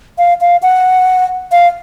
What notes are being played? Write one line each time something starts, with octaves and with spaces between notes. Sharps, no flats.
F5
F5
F#5
F5